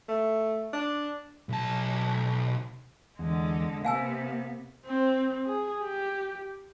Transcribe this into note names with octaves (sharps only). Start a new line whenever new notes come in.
A3
D4
B1 A5
E2 D3 G#3
C3 A#3 B3 F5 G#5 E6
C4
G#4
G4